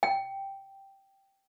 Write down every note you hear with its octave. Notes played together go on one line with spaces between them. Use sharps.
G5